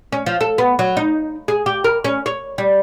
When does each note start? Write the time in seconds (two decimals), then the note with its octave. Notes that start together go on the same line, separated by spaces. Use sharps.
0.12 C#4
0.26 F3
0.41 A4
0.58 B3
0.79 F#3
0.97 D#4
1.48 G#4
1.66 G4
1.84 A#4
2.04 C#4
2.26 C#5
2.58 G3